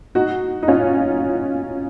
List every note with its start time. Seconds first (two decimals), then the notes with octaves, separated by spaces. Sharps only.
0.15 D#4 F#4
0.63 D#4
0.68 C#4 F4